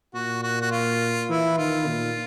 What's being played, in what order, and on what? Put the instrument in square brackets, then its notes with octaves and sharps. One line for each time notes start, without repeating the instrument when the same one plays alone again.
[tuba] A#2 [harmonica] F#4
[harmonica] F#4
F#4
F4
[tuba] E3 [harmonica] E4
[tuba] D#3 [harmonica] F4
[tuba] A#2